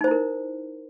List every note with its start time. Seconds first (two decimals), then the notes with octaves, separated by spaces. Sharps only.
0.01 D#4
0.04 C5
0.08 E4
0.11 A#4